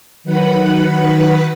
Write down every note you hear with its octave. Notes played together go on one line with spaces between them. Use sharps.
D#3 F#3 B4 F#5 B5